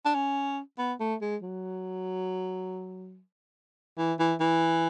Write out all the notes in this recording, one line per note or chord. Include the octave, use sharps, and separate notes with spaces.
D4
C#4
B3
A3
G#3
F#3
E3
E3
E3